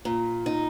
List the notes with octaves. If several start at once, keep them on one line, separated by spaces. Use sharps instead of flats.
A#2
D#4